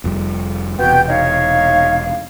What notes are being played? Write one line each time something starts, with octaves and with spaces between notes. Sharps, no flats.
F1 F2 G3
E1 C3 B3 F#4 G5
D#4 C#5 F5